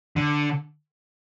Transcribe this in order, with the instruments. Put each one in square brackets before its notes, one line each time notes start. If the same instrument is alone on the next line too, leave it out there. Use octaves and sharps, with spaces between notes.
[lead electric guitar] D3